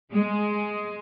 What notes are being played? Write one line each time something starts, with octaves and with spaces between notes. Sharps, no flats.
G#3